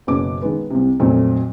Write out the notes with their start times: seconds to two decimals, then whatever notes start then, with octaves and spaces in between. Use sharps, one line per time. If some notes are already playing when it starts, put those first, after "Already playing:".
0.07 F#1 B2 C#4 D6
0.42 D#3 G#3 B3
0.70 C2 C3
1.00 F2 A#2 F#3 A3 C4